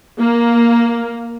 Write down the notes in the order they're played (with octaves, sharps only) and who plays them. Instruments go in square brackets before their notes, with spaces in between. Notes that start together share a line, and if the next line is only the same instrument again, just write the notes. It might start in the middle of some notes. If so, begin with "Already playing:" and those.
[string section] A#3